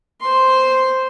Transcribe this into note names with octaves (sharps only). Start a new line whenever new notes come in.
C5 C6